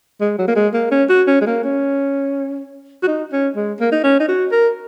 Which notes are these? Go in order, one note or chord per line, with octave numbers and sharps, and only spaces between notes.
G#3
F#3
A#3
G#3
A#3
C#4
F#4
C#4
G#3
A#3
C#4
F#4
D#4
C#4
G#3
A#3
D#4
C#4
D#4
F#4
A#4